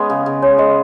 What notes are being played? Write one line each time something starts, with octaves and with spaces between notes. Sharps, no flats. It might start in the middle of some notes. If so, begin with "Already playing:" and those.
Already playing: G#3 B3 C#4
C#3
C#3
G#3 C#5
G#3 D#5